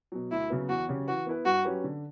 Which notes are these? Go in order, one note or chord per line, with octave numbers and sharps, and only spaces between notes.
B2 F#3
D2 E4
C#3 F#3 B3
E2 F#4
C#3 F#3 C#4 G4
E3 F#4
B3 E4 B4
G2 F#4
F#3 C#4 G4 B4
D3